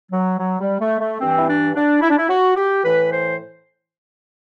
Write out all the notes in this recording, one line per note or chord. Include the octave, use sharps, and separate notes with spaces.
F#3
F#3
G3
A3
A3
G2 E3 C4
E4
D4
D4
E4
D4
E4
F#4
G4
A2 E3 B4
C5